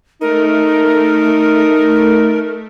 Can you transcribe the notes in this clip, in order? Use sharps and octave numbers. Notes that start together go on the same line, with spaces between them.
A3 D#4 A#4